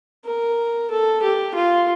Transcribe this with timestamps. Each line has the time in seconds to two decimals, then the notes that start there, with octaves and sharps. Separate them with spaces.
0.25 A#4
0.90 A4
1.22 G4
1.54 F4